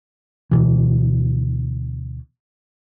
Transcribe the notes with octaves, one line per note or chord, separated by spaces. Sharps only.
D2 B2 E3